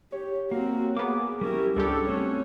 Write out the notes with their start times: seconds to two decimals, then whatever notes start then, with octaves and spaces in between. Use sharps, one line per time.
0.12 G4 C#5
0.51 A#3 C4 F#4 F5
0.97 A#3 B3 G#4 D6
1.41 G3 C#4 E4 G4 A#4
1.76 C#2 G#2 G3 D4 G4 A4 C#5
2.09 A3 C4 C#4 F#4 C#5